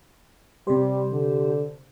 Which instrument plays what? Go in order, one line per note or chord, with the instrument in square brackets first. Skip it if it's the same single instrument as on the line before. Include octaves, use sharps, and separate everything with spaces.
[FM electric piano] C3 C5 [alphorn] G3 [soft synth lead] G4
[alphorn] D3